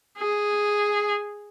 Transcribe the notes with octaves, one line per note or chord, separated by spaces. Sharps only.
G#4